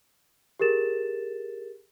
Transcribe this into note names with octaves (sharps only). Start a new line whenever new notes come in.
G4 G#4 A#4 A6 E7